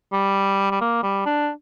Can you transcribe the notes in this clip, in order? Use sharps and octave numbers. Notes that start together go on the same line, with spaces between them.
G3
G3
A#3
G3
D4